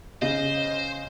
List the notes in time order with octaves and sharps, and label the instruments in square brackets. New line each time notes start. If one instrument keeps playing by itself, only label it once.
[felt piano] C#3 [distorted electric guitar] C5 [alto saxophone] D#5